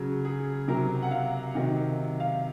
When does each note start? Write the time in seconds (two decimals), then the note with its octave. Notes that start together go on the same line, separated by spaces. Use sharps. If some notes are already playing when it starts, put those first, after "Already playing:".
Already playing: C#3 F#3
0.25 G#4
0.68 C3 F#3 A#4
1.03 F#5
1.11 F5
1.55 C3 D#3 F#3
2.20 F5